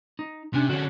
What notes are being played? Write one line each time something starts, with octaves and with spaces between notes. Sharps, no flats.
D#4
C3 C#4 D4 G#5
D3 C#4 F#4